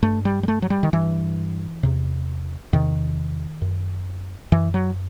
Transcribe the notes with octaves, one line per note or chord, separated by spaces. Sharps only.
G2 A3
G3
G3
A3
F#3
G3
D#3
G2 E3
E2 C3
E2 C3 D#3
F#2
F#2 E3
F#3